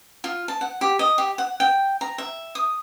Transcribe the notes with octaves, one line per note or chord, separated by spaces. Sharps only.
F4
A5
F#5
G4
D#5
G4
F#5
G5
A#5
E5
D#6